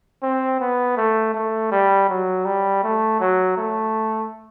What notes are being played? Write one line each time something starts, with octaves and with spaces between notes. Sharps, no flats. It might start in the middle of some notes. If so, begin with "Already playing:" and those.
C4
B3
A3
A3
G3
F#3
G3
A3
F#3
A3